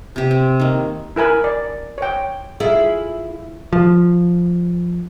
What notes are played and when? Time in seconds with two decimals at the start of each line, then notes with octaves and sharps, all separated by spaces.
0.16 C3 G4
0.31 C4
0.60 D#3 A#3
1.16 E4 A#4 G#5 B5
1.44 D5
1.98 C#5 G5
2.60 E4 F4 G#4
3.73 F3